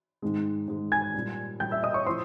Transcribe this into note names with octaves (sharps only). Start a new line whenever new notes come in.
G#2 D#3 G#3
G#2 D#3 G#3
G#5 G#6
A#2 G3
A#2 G3 G5 G6
E5 E6
D#5 D#6
C#5 C#6
A2 F3 C5 C6